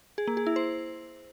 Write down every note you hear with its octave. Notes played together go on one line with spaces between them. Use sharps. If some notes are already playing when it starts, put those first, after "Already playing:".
G#4
A#3
G#4
E4
C5